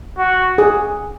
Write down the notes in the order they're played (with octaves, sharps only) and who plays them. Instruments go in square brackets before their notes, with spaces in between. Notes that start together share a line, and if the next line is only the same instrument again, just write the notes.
[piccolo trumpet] F#4
[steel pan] G#4